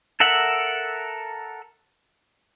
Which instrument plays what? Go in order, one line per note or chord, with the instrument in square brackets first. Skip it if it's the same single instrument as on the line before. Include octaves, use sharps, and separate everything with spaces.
[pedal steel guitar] A4 A#4 E5 F#5